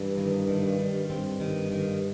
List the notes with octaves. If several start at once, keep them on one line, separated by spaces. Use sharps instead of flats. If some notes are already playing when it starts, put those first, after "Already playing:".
Already playing: G2 E3
D#3
D#3
G2 G3
G2 C4
D#3
D#3